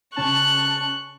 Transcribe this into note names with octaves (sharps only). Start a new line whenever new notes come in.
C#3 C#4 A5 C#6 F#6